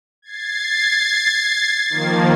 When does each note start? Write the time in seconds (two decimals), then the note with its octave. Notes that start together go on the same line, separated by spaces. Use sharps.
0.22 G#6 A6 C7
1.90 D#3 F3 A#3